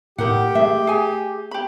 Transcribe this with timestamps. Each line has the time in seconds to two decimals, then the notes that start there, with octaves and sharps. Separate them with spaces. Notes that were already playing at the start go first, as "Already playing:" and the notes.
0.18 A2 D#4 G4 A#4 F#5
0.55 A3 G#4 E5
0.87 G#4 G#5
1.51 G4 B5